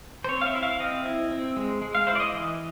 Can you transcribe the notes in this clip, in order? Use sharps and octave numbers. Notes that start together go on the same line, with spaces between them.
C5
C4 C#5
F5
E5
E4
F5
C4 D#5
E4
C4
G#3
G#3
F5
E4 C5
D5
D#5
E3